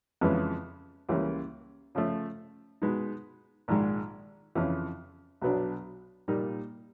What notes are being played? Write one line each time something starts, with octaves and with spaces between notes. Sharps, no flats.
F2 C#3 E3 G#3 B3
C#2 C#3 E3 G3 A#3
C#3 F3 A3
B2 G#3 B3 D#4
A#1 G#2 D#3 G#3
F2 C#3 E3
B1 B2 F#3 B3 D4
A#2 G3 A#3 D#4